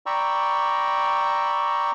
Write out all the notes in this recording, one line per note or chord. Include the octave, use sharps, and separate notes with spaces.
D5 G5 A#5 B5 C#6 E6